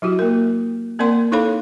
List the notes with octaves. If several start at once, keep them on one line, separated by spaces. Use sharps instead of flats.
F#3 E4 F#4 G4
A#3 A#4
A#3 C4 A#4 D5 F#5 C6
D#4 E4 A4 C#5 F5 B5